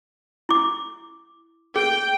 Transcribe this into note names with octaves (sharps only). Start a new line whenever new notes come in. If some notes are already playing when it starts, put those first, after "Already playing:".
E4 D6
G#4 G5